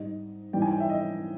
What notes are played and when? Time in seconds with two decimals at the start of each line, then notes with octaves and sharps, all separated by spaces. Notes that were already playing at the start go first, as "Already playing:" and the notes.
Already playing: G#2 G3 D#5
0.53 G#2 E3 G3 G5
0.62 G#5
0.71 G5
0.80 E5
0.89 D#5